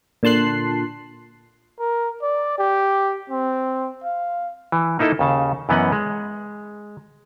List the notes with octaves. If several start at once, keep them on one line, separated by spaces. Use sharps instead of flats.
A#2 D3 A5 C6 F#6 C7
A#4
D5
G4
C4
F5
E3
A#3 D#4 E4 A4 D#5
D#2 C#3 A5
F#2 E3 B3 C#4 D#5 F#5
G#3